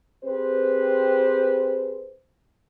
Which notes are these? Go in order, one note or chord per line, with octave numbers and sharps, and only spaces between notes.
C4 G4 G#4 B4 C5